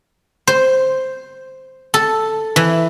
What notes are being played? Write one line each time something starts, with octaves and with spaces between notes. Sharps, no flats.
C5
A4
E3